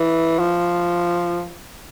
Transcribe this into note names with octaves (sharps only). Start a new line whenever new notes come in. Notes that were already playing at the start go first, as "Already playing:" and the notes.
Already playing: E3
F3